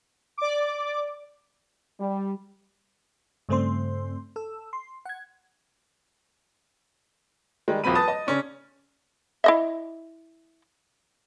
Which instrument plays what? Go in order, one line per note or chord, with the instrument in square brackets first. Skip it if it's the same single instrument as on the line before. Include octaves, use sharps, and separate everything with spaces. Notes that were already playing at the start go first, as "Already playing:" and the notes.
[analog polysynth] D5 D6
[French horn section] G3
[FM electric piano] G2 C#3 A3 C4 C5 C6
A4 E6
C6
F#5 G#6
[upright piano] D#3 G3 G#3
D#1 F3 F#3 C4 B5 D#7
B4 A5 D#6 A6
D#5
C#3 C#4 D4
[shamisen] E4 D#5 E5